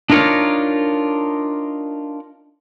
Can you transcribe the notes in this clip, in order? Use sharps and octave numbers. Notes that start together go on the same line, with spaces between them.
D4 D#4 F4 A#4 C#5 D5